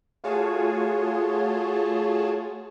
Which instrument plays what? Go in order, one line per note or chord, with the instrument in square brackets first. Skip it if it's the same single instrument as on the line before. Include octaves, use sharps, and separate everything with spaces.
[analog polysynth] A3 F4 F#4 G#4 C#5 A5